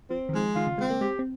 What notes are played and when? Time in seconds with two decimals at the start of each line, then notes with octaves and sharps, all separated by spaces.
0.10 F3 C4
0.29 D#3
0.33 F3 G#3
0.56 D#3 F4
0.67 C#3
0.78 G#3 C4
0.90 A#3
1.01 G#3 G4
1.19 C4